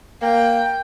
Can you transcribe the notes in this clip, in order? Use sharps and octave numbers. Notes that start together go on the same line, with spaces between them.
A#3 G5